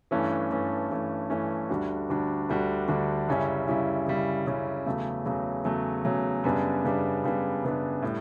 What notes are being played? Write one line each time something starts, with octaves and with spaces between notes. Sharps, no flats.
G2 E3 A3 C#4
G2 E3 A3 C#4
G2 E3 A3 C#4
G2 E3 A3 C#4
D2 D3 G3 D4 F#4
D2 D3 G3 D4 F#4
D2 D3 G3 D4 F#4
D2 D3 G3 D4 F#4
F#2 C#3 G3 C#4 E4
F#2 C#3 G3 C#4 E4
F#2 C#3 G3 C#4 E4
F#2 C#3 G3 C#4 E4
E2 C#3 F#3 A3
E2 C#3 F#3 A3
E2 C#3 F#3 A3
E2 C#3 F#3 A3
F#2 C#3 G3 B3 D4
F#2 C#3 G3 B3 D4
F#2 C#3 G3 B3 D4
F#2 C#3 G3 B3 D4
A2 G3